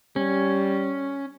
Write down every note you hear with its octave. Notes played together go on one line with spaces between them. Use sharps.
G3 C#4